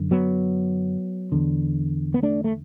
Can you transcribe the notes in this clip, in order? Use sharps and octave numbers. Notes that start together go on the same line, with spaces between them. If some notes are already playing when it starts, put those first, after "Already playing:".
Already playing: F#2 D3
F#3 B3
E2 D3
B3
A3 D4
A3